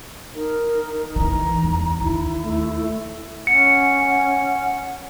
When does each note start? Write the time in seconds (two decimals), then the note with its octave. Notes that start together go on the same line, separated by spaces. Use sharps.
0.34 D#4 A#4
1.16 D#3 E3 A#5
1.63 E2
2.01 D#2 E4
2.43 A3
3.47 C#4 F#5 C#7